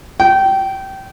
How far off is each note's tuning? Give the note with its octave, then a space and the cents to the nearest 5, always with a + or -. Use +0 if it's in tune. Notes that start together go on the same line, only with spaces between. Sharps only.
G5 -20